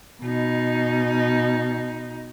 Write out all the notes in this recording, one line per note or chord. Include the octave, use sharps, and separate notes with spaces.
B2 D#4